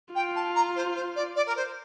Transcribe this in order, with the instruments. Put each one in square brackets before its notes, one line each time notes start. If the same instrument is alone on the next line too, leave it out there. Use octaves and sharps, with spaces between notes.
[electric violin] F4 [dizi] G5
[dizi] A5
A#5
C5
C5
D5
D5
A#4
C5